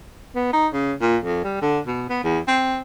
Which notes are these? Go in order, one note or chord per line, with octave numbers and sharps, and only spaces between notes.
B3
D#4
C#3
A#2
F2
G3
D3
B2
B3
E2
C4